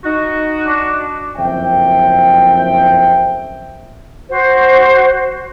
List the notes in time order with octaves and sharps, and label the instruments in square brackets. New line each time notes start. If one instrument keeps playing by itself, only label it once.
[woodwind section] D#4 F#4
[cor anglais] D4
[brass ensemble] F#1 F2 C5 E5 G5
[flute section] F#4 C5